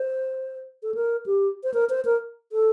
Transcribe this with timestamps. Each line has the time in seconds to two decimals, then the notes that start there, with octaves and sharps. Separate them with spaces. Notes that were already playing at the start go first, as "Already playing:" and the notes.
Already playing: C5
0.83 A4
0.94 A#4
1.26 G4
1.64 C5
1.74 A#4
1.89 C5
2.05 A#4
2.52 A4